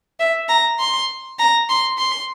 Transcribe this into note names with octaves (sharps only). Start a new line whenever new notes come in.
E5
A#5
C6
A#5
C6
C6